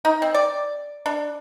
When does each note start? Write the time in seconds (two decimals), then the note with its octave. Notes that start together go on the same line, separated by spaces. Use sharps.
0.05 D#4
0.22 C4
0.34 D5
1.06 D4